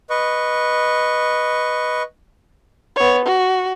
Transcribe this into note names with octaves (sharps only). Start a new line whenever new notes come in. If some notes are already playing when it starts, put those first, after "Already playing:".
B4 D#5 C#6
B3 C#5
F#4